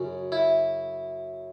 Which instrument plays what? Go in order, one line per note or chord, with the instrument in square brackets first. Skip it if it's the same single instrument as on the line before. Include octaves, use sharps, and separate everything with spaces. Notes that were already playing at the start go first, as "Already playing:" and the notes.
Already playing: [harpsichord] F#2 C#3 F#3
E4